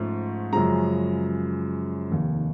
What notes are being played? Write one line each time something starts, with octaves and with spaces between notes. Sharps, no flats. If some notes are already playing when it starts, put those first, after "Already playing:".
Already playing: G#2 F3 A3 C#4
F#2 C#3 F3 G#3 A#5
F1 D#2 D#3